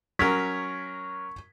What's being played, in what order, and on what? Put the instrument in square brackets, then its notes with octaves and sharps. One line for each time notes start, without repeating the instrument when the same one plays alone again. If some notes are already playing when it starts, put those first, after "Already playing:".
[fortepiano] F#3 C#4 A#4 [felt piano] C#6 G#6 B6